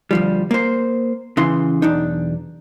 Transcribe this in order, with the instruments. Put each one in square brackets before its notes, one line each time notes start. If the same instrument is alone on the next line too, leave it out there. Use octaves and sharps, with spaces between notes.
[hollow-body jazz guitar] D2 F3 G3
A#3 C5
C#3 E3 C6
B1 E2 D4 D#4